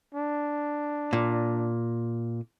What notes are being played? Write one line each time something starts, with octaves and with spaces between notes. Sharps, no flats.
D4
A#2